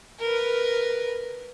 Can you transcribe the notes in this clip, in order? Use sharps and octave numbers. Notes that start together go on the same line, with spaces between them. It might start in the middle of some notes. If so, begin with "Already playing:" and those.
A#4 B4